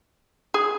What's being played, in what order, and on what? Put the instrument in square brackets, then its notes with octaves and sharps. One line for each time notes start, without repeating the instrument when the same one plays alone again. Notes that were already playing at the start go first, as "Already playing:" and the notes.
[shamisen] G#4